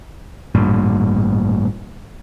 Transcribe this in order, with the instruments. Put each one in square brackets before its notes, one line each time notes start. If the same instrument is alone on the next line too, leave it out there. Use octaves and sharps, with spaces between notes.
[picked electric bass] A1 G2 A#2